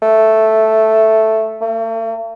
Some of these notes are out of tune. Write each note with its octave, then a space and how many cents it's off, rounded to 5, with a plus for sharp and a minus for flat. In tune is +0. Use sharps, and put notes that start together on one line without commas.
A3 +0
A3 +45